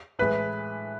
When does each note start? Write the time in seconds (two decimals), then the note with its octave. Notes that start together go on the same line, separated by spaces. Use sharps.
0.19 A2 E3 G#3 B4